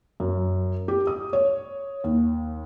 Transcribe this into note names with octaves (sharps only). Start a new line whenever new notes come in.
F#2
G4
D#6
C#5
D#2